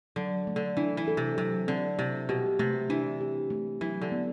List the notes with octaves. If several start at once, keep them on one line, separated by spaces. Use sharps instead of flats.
D3 F#3
A3
D3
E3 D4
E3
A4
C3
C3 F#3
D3 C4
C3 E4
B2 G4
C3 A3
E3 D4
G4
A3
E3 F#3
D3
B3